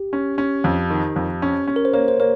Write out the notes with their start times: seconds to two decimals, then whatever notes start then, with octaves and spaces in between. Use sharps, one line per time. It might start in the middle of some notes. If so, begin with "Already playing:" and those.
Already playing: G4
0.13 C#4
0.38 C#4
0.64 F2
0.90 D#3
1.16 F2
1.42 C#4
1.67 C#4
1.76 A#4
1.85 C5
1.94 A#3 C#5
2.08 C5
2.20 A#3 C#5